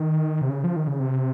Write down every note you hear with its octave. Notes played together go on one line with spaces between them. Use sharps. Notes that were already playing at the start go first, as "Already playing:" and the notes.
Already playing: D#3
C3
C#3
F3
D#3
C#3
C3